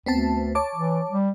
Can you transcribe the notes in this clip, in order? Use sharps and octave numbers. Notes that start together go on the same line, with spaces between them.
D2 B3 C4 A5
C#5 A5 D6
E3
G3